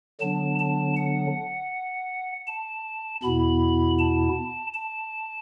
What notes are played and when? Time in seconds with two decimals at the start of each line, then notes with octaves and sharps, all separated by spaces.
0.21 D3 F#3 B3 D4 A5
0.59 A5
0.97 F#5
2.47 A5
3.23 E2 B2 B3 E4 B5
3.99 A5
4.74 A5